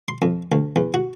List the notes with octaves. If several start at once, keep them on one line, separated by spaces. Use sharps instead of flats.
C6
F2
D2
E2
F#4